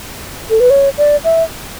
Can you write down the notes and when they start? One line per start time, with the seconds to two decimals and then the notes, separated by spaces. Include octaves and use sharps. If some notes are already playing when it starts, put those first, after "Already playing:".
0.50 A4
0.60 B4
0.70 C#5
0.98 D5
1.24 E5